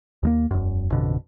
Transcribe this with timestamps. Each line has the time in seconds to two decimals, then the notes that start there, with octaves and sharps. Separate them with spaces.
0.23 D#2 G#3 A#3
0.51 E1 F#2
0.92 A1 F2 B2 D3